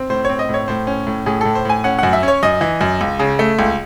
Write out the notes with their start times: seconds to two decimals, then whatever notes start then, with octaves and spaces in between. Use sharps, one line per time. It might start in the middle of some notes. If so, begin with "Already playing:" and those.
Already playing: C4
0.10 A2 C5
0.25 C4 C#5
0.39 D#5
0.49 A2
0.54 C#5
0.68 A2 C5
0.87 C#4
1.07 A2
1.26 A2 G#4
1.41 A2 A4
1.55 C5
1.65 A2 G#5
1.84 C#4 F#5
1.99 F#2 F#5
2.13 E5
2.23 C#4
2.28 C#5
2.43 F#2 D#5
2.61 E3
2.81 F#2
3.01 C#2
3.19 C#3
3.39 A3
3.59 C#2